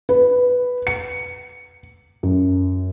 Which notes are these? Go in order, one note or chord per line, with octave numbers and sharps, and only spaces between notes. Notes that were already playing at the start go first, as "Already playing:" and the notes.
B4
C#7
F#2